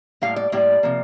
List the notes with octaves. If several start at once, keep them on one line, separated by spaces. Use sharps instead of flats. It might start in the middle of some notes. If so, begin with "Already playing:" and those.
A2 G3 A#3 F5
D5
A2 G3 A#3 D5
C3 F3 A#3